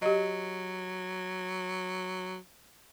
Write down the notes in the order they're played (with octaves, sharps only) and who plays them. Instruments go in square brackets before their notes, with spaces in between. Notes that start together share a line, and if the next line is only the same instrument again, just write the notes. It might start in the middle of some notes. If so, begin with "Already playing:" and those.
[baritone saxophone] F#3 [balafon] G4 D#5